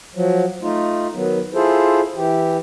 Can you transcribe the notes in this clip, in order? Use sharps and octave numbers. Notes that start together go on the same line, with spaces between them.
F3 F#3
A3 D#4 F4
D#3 F#3 B3
E4 F4 G#4 A4 C5
E3 G4